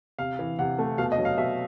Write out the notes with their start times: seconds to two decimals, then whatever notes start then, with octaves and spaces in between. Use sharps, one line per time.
0.19 C3 F5
0.39 E3
0.59 C3 F#5
0.79 A3
0.98 B2 F5
1.12 D#5
1.18 F#3
1.25 F5
1.38 B2 E5